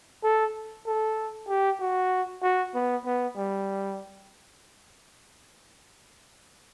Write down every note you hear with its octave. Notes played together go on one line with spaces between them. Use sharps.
A4
A4
G4
F#4
F#4
B3
B3
G3